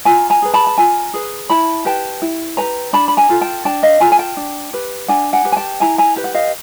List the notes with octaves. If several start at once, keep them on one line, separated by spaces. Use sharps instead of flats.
F4 G#5 A#5
G#5 A#5
G#4 B4
A5 B5
A5
F4 G#5 A#5
G#4 B4
E4 A5 B5
G4 B4 G5 A5
E4
G4 B4 G#5 A#5
D4 A5 B5
B5
G#5 A#5
F4 A4
G5 A5
D4 G5 A5
D#5 F5
F4 A4 G#5 A#5
G#5
G5 A5
D4
G4 B4
D4 F#5 G#5
F#5 G#5
G4 B4
G#5
G5 A5
E4 G#5 A#5
G#5 A#5
G4 B4
F#5
D#5 F5